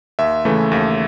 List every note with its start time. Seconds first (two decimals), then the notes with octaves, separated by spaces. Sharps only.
0.19 D#2 E5
0.45 C#3 E3 A3
0.72 D#2